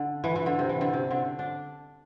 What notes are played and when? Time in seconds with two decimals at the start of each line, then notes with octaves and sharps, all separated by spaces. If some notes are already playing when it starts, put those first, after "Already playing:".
Already playing: D3
0.24 E3
0.36 E3
0.46 D3
0.59 C3
0.69 E3
0.81 D3
0.93 C3
1.11 D3
1.39 D4